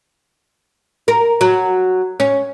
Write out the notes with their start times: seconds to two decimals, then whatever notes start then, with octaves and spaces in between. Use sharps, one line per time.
1.08 A#4
1.41 F#3
2.20 C#4